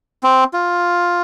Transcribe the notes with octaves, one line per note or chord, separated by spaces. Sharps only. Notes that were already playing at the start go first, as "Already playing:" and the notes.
C4
F4